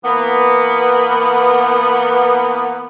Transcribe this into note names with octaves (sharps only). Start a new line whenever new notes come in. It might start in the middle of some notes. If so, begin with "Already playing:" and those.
E3 A#3 B3